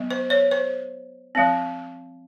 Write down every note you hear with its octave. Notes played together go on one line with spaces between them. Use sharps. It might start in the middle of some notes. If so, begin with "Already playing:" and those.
Already playing: F#3 B3
C5
C#5
C5
F3 G#3 C4